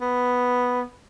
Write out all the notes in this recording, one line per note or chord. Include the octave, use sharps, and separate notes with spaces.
B3